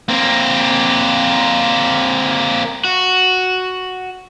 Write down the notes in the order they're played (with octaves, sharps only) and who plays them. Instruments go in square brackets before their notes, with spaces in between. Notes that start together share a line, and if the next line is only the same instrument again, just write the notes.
[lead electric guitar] A#3 C4
[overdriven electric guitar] F#4